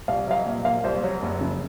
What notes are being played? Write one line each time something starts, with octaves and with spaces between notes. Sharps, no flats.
C2 F5
F#3 F5
D#5
A#2
A#3 F5
C2 C5
F#3 C#5
F#1
C#3